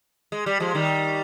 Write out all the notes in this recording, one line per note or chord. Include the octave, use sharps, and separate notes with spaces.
G#3
G3
F3 G#3
D#3 G3